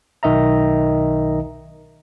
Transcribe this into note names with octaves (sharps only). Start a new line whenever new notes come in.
B1 D#3 D#5 E5 A#5